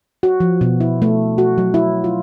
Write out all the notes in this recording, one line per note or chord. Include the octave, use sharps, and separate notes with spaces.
F#4
F3
B2
E4
A3
F#4
F#3
E4
F4